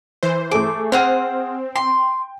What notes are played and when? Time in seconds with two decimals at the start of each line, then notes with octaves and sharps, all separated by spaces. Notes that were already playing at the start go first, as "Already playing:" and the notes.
0.23 E3 C5
0.51 A3 G#4 D6
0.92 C4 G#4 C5 F#5 F6
1.76 G5 C6